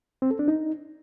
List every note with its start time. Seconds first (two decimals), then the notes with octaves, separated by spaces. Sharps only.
0.22 C4
0.31 A4
0.39 D4
0.48 D#4